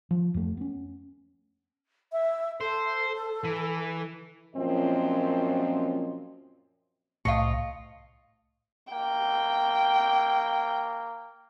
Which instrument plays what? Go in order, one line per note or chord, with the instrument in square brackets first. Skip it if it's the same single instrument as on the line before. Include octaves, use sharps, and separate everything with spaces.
[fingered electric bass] F3
F2 A3
B3 C#4
[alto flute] E5
[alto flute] A4 [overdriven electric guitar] C5
[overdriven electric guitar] E3
[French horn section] F#2 A#2 F3 C4 C#4 D#5
[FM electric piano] C2 A2 [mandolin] F4 D#5 C#6
[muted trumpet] A#3 [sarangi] G5